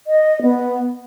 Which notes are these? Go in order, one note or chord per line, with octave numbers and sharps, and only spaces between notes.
D#5
B3